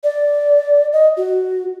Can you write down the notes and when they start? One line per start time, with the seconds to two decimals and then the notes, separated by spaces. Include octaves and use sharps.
0.04 D5
0.93 D#5
1.17 F#4